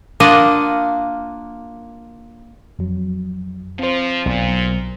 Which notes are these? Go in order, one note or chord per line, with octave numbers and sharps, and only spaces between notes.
A#3 D4 F4 D#5 F#5
F2 F#3
F3 C4 C5
B1 A#2